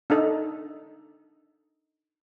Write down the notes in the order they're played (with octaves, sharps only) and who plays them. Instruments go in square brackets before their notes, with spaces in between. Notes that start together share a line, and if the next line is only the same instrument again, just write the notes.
[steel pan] D4 D#4 A4 D#5